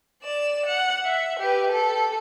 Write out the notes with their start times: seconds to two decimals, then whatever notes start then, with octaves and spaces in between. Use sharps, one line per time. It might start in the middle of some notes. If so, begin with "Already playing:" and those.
0.23 D5 E7
0.66 F#5
1.05 E5
1.39 G4 B4
1.72 A4